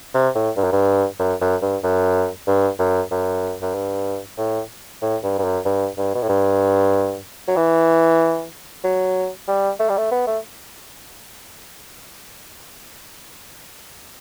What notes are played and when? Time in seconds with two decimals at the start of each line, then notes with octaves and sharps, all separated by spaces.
0.14 C3
0.35 A2
0.57 G2
0.64 F#2
0.72 G2
1.19 F#2
1.41 F#2
1.62 G2
1.84 F#2
2.47 G2
2.79 F#2
3.11 F#2
3.62 F#2
3.75 G2
4.38 A2
5.02 A2
5.23 G2
5.39 G2
5.44 F#2
5.65 G2
5.98 G2
6.15 B2
6.22 A2
6.29 G2
7.48 F#3
7.57 E3
8.84 F#3
9.48 G3
9.80 A3
9.89 G3
9.98 A3
10.12 B3
10.27 A3